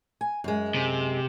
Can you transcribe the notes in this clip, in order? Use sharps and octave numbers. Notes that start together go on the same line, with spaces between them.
G#5
F#2 G#3
C3